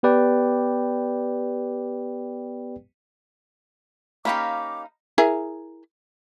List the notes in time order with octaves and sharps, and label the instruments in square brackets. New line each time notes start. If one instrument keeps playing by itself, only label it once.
[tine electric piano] B3 G4 B4 D5 G5
[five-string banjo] A#3 C#4 G4 [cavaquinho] D#4 F5 B5 [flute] D6
[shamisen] E4 G#4 A#4